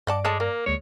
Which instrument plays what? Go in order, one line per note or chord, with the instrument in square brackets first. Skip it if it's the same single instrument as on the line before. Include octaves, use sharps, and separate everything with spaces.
[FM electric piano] G2 D5 D6 [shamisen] D#5 F#5 A5
[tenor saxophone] G#3 [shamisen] A4 C#5 A5
[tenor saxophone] A#3 [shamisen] A#4
[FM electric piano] D2 G#3 A#3 [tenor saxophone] C#5